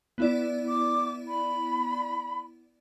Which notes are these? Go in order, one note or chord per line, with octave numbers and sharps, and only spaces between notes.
B3 E4 D5
D6
B5